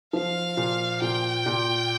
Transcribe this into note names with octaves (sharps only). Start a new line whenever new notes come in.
F3 F5
A#2
A#2 G5
A#2